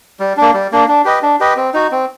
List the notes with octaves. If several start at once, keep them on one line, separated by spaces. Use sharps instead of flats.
G3
A#3 D4
G3
A#3 D4
D4
G4 B4 D#5
D4
G4 B4 D#5
C4
D#4 F#4
C4